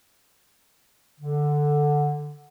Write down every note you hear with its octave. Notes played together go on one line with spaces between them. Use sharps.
D3